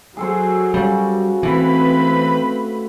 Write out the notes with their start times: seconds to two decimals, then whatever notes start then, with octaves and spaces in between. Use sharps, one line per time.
0.17 F#3 G#4 A4 C5
0.74 C#3 G3 F#4
1.43 E3 A3 C4 B4 B5